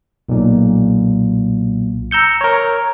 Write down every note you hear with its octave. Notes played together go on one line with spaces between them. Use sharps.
B1 A#2
A#5 E6 G6 C#7
A#4 C#5